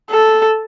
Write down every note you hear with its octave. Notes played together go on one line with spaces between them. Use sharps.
A4